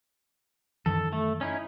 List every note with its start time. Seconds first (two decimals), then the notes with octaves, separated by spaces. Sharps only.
0.86 F#2 D#3 E3 A4
1.13 A3
1.41 C#4 D#4 E4